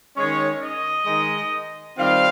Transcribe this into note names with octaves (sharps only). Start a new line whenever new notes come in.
D#3 G#3 C#4 C#5
D#5
D#3 G#3 D#4
D#3 G3 C4 F4 F5